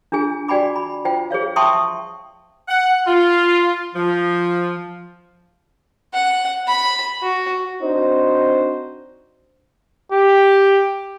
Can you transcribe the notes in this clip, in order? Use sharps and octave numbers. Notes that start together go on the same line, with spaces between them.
D4 F4 G#4 G#5
F#4 D5 G5 G#5 B5 D6
B5
F4 C5 G5
G#4 C5 C#5 F5
E5 G5 A5 C6 C#6 D#6
F#5
F4
F3
F#5
B5
F#4
C4 D4 D#4 F#4 C5
G4